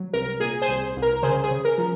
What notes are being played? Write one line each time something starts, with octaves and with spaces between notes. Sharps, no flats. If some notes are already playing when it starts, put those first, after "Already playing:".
Already playing: F#3
C2 A#4
A#2 G#4
G#4 C5
C2
C2
A#4
C#3 G#4 C5
G#4
C#3
A#4
F3